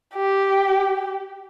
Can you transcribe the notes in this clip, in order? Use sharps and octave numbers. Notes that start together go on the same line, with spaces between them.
G4